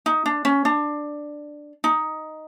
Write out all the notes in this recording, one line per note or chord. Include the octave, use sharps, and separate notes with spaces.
D#4
D4
C#4
D4
D#4